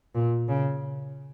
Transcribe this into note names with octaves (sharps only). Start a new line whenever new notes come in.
A#2
C#3